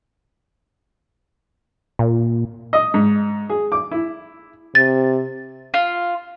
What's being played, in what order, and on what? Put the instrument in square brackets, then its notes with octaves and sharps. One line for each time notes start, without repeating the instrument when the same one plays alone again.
[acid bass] A#2
[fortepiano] D#5
G#2
G#4
D6
E4
[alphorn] C3 [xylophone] A6
[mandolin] F4